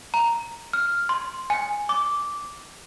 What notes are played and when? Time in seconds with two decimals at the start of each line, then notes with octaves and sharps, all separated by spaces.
0.14 A#5
0.73 F6
1.09 C6
1.50 G#5
1.89 D6